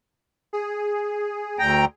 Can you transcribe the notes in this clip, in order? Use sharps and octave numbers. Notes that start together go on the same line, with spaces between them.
G#4
D2 G5 A#5